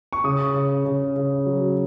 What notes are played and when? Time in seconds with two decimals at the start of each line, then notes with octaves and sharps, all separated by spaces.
0.13 C#6
0.24 C#3 D#6
0.54 C#3
0.85 C#3
1.16 C#3
1.46 F#3